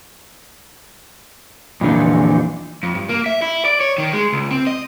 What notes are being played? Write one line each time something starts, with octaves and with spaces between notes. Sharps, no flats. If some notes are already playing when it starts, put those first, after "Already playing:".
F2 A#2 D3 E3 D#4
F2
G2
A#3
E5
E4
D5
C#5
D#3
G#3
C#2
C4
D#5